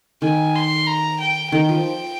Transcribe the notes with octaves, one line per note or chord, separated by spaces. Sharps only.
D#3 G#5
C6
A#5
G5
D#3 G5
F3